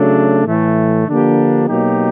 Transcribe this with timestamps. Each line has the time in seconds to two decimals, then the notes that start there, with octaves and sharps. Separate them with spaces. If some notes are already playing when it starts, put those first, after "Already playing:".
Already playing: C#3 F#3 A3 D4
0.44 A2 E3 A3
1.06 D3 F3 A#3 D4 G4
1.68 B2 F#3 A#3 D#4 G4